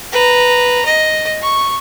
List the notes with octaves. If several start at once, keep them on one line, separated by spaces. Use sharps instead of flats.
B4 A#5
D#5
C#6